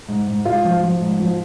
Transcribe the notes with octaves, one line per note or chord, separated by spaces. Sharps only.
G#2
G#2
G#2 F4
F3
F3
G#2
F3